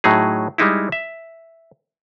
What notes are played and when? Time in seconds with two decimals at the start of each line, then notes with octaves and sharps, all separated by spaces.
0.04 A2 F#3 D#4 G#4
0.58 G3 G#3 D#4 E4
0.92 E5